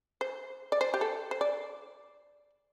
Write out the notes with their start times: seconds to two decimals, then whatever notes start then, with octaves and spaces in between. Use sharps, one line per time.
0.21 C5
0.72 D5
0.81 C5
0.94 G4
1.01 A4
1.31 C5
1.41 D5